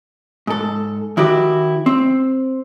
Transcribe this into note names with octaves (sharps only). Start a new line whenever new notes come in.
G#2 A4
D#3 E4 F#4 G4
C4